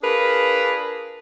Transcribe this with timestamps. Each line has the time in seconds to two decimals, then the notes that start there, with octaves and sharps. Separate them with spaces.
0.02 D4 F4 G#4 A#4 B4